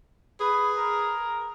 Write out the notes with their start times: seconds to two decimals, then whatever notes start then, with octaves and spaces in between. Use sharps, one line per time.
0.40 G#4 B4
0.77 A#4